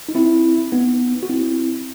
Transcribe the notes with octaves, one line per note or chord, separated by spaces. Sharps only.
D#4
C4 E4
B3 D#4
F#4
C4 E4